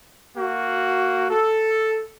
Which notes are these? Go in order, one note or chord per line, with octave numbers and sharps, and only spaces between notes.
A#3 F#4
A4